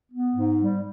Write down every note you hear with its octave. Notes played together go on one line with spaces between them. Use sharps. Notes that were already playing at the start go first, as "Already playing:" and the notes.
B3
G#2
G3